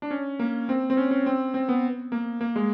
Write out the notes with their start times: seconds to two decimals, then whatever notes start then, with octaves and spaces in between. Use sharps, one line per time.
0.02 D4
0.10 C#4
0.39 A#3
0.69 C4
0.90 C4
0.97 C#4
1.11 C#4
1.26 C4
1.54 C4
1.69 B3
2.12 A#3
2.41 A#3
2.56 G#3